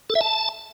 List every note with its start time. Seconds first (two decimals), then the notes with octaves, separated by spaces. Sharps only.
0.10 A4
0.15 E5
0.21 A5